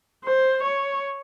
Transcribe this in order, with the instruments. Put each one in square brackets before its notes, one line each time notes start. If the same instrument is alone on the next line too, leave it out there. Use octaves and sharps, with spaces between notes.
[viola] C5
C#5